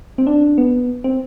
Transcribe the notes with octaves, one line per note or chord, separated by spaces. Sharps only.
C4
D4
B3
C4